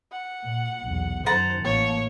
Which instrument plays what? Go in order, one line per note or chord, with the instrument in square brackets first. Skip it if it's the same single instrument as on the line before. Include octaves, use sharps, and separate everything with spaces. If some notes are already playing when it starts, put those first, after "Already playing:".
[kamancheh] F#5
[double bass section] A#2
B1 E2
[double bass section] F#2 D#3 [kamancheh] C5 [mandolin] F#5 A5 A#5
[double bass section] A1 E3 A#3 [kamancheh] C#5